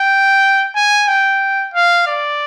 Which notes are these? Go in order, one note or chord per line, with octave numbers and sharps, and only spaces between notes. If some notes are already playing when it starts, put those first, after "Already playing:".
Already playing: G5
G#5
G5
F5
D5